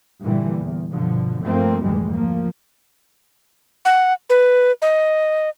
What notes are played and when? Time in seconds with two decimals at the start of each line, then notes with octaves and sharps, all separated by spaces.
0.21 G2 A#2 D3 E3 G3
0.60 E2
0.93 G2 B2 D3 F3
1.42 G2 F3 A3 A#3 C4
1.82 F1 D2 G#2 E3 G3 G#3
2.14 F3 A#3
3.85 F#5
4.30 B4
4.82 D#5